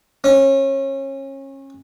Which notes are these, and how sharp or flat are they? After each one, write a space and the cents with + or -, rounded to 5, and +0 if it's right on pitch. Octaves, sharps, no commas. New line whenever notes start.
C#4 -30